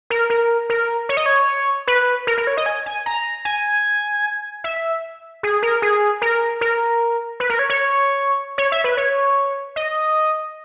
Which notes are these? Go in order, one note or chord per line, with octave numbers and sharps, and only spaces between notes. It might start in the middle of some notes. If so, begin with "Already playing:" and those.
A#4
A#4
A#4
C#5
D#5
C#5
B4
A#4
A#4
C#5
D#5
G#5
G#5
A#5
G#5
E5
G#4
A#4
G#4
A#4
A#4
B4
A#4
C#5
C#5
C#5
E5
B4
C#5
D#5